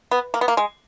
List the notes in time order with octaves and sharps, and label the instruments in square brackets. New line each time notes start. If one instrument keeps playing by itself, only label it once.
[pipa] B3
A#3
B3
A#3
G#3